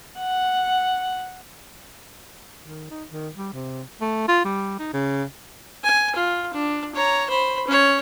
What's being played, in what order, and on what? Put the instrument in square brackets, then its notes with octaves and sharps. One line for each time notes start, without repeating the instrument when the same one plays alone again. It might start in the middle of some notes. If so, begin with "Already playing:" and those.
[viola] F#5
[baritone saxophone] D#3
D#4
D#3
G3
C3
A3
F4
G3
D#4
C#3
[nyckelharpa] G#5
F4
D4
C#5 A#5
C5 B5
C#4 C#5